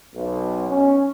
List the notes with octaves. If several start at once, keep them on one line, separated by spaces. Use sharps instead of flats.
B1
C#4